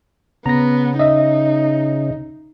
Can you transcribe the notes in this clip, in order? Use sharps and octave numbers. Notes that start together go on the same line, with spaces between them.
C#3 B3 A#5 A#6
D#4 D#5 E5